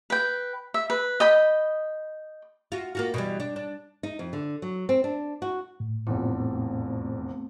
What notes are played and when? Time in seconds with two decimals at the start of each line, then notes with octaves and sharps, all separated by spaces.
0.10 B4 G5
0.74 E5
0.90 B4
1.20 D#5 G5 B5
2.72 F4 F#4
2.95 A#3 F4 F#4
3.14 B2 E3 G3
3.40 D4
3.56 D4
4.03 D#4
4.19 F2
4.33 D3
4.62 F#3
4.89 C4
5.04 D4
5.42 F#4
5.80 A2
6.07 F1 A#1 E2 A3 B3 C4